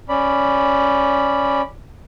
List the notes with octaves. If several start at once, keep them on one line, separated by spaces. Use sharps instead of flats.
C#4 D5 B5